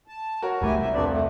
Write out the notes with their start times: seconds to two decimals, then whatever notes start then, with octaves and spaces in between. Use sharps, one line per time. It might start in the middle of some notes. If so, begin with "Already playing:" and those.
0.08 A5
0.42 F#4 A#4 C#5
0.62 F#1 C#2 A3 E4 G4 G#5
0.81 C2 E5
0.94 E1 C3 A3 D4 B4 D5
1.07 A3